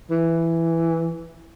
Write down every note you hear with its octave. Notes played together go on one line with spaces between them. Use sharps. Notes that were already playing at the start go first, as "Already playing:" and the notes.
E3